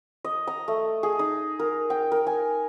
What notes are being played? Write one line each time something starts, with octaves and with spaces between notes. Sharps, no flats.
D#5
A#5
A3
G#4
D#4
A#4
G5
A#4
G#5